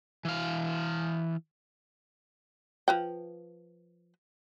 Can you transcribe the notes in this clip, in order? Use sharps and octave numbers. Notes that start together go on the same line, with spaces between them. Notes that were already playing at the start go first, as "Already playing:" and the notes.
E3 F5
F3 B4 G5